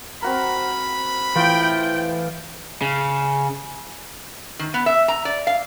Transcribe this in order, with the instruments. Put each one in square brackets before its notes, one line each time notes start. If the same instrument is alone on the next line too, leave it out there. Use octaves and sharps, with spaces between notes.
[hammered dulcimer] C4 F#4 A#4 [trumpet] B5
[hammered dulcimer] A2 F4 [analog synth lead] E3 [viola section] G5
[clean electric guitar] C#3
[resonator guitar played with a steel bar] D#3
B3
E5
A#5
D5
F5